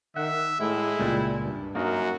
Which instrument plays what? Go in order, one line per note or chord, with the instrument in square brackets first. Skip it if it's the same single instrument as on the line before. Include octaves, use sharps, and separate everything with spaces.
[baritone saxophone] D#3 [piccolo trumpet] E5 [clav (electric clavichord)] F#5
[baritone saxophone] A2 [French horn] G#3 [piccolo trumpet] E4
[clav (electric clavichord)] C#2 A#2 [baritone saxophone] G3
[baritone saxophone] G2
[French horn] F#2 [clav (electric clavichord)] A#3 D#4 A#4 [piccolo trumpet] F#4